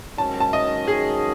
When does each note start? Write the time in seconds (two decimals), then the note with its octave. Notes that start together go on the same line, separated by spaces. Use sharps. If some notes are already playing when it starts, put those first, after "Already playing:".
0.18 G#2 D#3 F#3 C#4 A5
0.40 A5
0.53 D#5
0.88 G#4